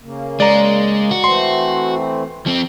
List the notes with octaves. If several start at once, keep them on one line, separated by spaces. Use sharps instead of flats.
C#3 A#3
G#3 D5 A#5
F#4
E3 A3 C4 C6
F3 C4